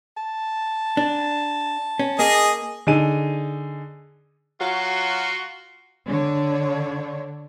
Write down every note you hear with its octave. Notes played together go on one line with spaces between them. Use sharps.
A5
D4
C#4
A#3 G#4 D#5
D3 D#4 G#4 D#7
F#3 F4 F#4
D3 D4 C#5